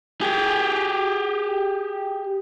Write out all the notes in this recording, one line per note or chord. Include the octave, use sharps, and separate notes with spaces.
G4 G#4